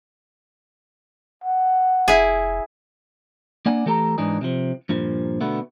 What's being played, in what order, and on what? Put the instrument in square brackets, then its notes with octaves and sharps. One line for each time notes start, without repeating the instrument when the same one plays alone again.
[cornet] F#5
[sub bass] F1 [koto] E4 G#4
[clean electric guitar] A#3 D4 D5 F#5 G#5
E3 A3 G4 A4 G#5 A#5
G#2 E3 D4 D#4 G#4
C3 F3
G2 A#2 F3
B2 D3 A3 B3